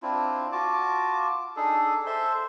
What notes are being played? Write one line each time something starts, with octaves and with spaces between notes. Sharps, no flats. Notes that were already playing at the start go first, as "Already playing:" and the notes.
C4 D4 E4 F4
F4 F#4 A5 D6
D4 D#4 G#4 A4
A4 C5 E5 C6